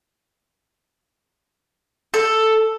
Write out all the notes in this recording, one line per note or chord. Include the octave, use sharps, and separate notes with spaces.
A4